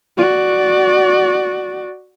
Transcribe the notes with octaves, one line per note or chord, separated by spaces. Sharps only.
F#4 D5